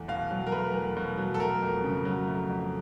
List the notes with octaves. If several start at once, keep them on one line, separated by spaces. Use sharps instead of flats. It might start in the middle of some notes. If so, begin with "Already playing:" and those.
Already playing: E2 A3
B2 F5
F#3
A#4
A3 B4
E2
B2
F#3
A4
A3 A#4
F2
C#3
F#3
A3
F2